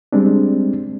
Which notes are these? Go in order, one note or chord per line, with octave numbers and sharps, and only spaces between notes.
G3 G#3 C4 D4